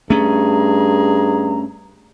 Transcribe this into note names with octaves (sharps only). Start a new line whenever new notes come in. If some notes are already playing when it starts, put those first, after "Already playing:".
G2 A3 C#4 G#4 A#5